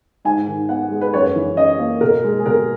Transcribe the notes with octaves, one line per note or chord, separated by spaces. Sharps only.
G#2 G#5
D#3
B3 F#5
G#3
B4
F#2 C#5
E3
C#4 D#5
A#3
B2 A#4
G#3
G#4
B2 A#4